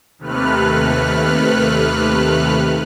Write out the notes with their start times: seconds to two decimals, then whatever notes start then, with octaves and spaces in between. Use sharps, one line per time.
0.18 D#2 C3 A3 B4 F6 F#6